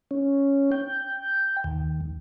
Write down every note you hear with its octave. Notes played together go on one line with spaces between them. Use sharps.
C#4
G5
D#2